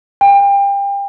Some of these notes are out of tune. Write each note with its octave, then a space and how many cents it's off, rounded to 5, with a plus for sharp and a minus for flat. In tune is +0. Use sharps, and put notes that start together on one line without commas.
G5 +30